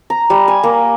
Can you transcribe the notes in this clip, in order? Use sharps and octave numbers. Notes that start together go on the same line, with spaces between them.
A#5
G3
G#5
A#3